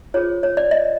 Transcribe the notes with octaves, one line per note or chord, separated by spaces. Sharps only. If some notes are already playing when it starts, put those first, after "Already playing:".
F4 G#4 C5 C#5
C#5
D5
D#5